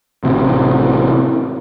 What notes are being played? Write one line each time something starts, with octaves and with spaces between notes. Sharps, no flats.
A1 C3 E3